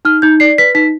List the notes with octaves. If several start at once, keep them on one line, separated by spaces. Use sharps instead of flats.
D#4 F6
D#4 G6
D5 C7
B4 B6
D#4 B6